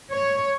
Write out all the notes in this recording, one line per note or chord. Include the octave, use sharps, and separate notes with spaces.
C#5